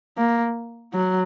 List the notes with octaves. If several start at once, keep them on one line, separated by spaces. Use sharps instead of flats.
A#3
F#3